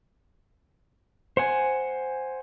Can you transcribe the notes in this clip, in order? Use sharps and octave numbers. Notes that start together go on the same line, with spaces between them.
C5 F#5 G#5